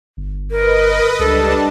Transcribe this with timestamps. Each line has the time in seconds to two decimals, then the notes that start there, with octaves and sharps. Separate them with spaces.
0.17 G1
0.51 A#4 B4 D#5
1.19 C#2 G3 D4 A4 A5